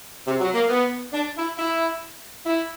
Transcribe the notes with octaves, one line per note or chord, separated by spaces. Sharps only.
C3
F#3
A#3
B3
D4
E4
E4
E4